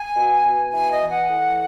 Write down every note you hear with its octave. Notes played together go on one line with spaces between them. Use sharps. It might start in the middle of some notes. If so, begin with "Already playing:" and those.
Already playing: G#5
B2
B2
E3 G#5
D#5
E3
F#5
A2